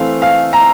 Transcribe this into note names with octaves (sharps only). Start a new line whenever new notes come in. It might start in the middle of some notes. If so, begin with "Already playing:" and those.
Already playing: E3 A3 C4 F5
F5
A#5